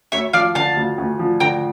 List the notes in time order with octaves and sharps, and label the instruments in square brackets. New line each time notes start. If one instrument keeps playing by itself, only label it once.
[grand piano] D2 [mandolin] C#5 E5
[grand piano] F3 [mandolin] D5 F5
[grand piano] D3 [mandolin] F5 A5
[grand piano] D2
D2
F3
[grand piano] D3 [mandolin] G5 A#5